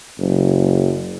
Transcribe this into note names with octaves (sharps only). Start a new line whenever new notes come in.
F#1